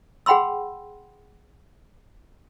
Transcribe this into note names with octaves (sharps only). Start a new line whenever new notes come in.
G#4 F#5 G5 B5 C6 E6